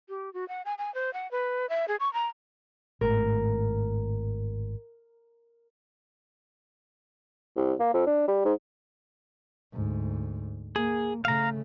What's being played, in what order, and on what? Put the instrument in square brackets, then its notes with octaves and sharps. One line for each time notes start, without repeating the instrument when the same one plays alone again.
[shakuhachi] G4
F#4
F#5
G#5
G#5
C5
F#5
B4
E5
G#4
C#6
A#5
[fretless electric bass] G#1 A2 [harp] A#4
[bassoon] C2
A#3
F2
D4
G3
G#2
[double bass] D2 G#2
[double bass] A#3 [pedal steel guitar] G#4
[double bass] C#3 A3 [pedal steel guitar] F5 A#5